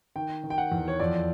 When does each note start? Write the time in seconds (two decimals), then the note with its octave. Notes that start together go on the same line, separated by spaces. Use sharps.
0.16 D#3 G5
0.44 D#3
0.50 G5
0.58 F#5
0.72 E2
0.88 C#5
1.00 F2 D5